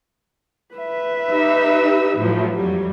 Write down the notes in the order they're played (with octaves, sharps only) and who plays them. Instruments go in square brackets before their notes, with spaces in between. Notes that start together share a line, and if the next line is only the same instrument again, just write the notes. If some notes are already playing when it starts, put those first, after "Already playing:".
[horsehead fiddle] B4 E5
[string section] D#4 G4 E6
A2 F3 F#3
F2 F#3 G3